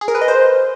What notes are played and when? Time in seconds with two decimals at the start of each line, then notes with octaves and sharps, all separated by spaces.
0.01 G#4
0.08 A#4
0.15 B4
0.21 D#5
0.28 C5